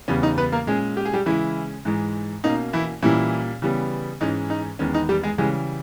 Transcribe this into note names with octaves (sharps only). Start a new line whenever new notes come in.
E2 C#3 G3 B3 C#4
D#4
B3 B4
A#3 A#4
A#2 G#3 C#4 G#4
G4
G#4
G3 G4
C#3 E3 G#3 C#4 E4
G#2 E3 G#3
B2 A#3 C#4 D#4
E3 E4
A#2 E3 G3 C#4 E4
C#3 E3 G3 B3
G#2 E3 G#3 C#4 D#4
D#4
E2 D#3 G#3 B3 C#4
D#4
G3 G4
G#3 G#4
C#3 E3 G3 G#3 G#4